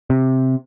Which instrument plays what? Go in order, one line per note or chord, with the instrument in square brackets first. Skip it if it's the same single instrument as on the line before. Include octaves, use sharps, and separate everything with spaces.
[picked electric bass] C3